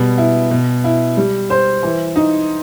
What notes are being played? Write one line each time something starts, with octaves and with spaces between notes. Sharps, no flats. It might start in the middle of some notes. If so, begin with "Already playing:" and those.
Already playing: B2 G3
E4
B2
E4
G3
C5
E3
D#4